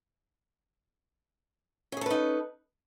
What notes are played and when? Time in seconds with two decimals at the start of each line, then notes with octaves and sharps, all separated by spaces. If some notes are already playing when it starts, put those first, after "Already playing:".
1.92 C#4
1.97 G#4
2.01 A4
2.06 B4
2.10 D#4